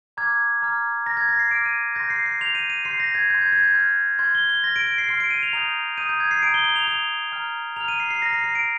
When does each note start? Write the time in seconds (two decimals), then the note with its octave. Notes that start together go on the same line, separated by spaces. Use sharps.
0.17 A#5 D6 F6 G#6
0.62 A#5 D6 F6
1.06 A#5 D6 F6 A#6
1.17 G#6
1.29 A#6
1.39 C7
1.51 A#5 D6 F6 D7
1.65 D#7
1.95 C6 G6 A#6
2.10 C7
2.26 C7
2.41 C6 G6 F7
2.55 D#7
2.70 D#7
2.85 C6 G6 C7
3.00 A#6
3.15 G#6
3.30 C6 G6
3.41 G#6
3.52 G#6
3.63 G6
3.74 C6 F6 G6
4.19 C6 F6 G#6
4.35 G7
4.49 G7
4.63 C6 F6 A#6
4.76 D7
4.87 D7
4.98 C7
5.09 C6 F6 C7
5.20 D7
5.31 D#7
5.43 F7
5.53 A#5 D#6 G6 F7
5.98 A#5 D#6 G6 D#7
6.09 G6
6.20 G#6
6.31 C7
6.42 A#5 D#6 G6 D7
6.54 G7
6.65 G7
6.76 F7
6.87 A#5 D#6 G6 F7
7.32 A#5 F6
7.76 A#5 F6 F7
7.88 D#7
8.00 C7
8.11 C7
8.22 A#5 F6 A#6
8.33 C7
8.44 C7
8.55 D7